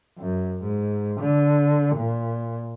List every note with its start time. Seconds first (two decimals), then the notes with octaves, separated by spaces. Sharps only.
0.19 F#2
0.63 G#2
1.20 D3
1.96 A#2